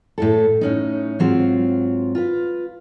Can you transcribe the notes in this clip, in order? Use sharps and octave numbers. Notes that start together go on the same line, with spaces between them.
A2 E4 A4
A2 C#4 D#4
G#2 F#3 C4 F4
F4 B4